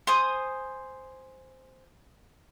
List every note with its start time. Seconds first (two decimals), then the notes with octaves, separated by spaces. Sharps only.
0.07 C5 G#5 D#6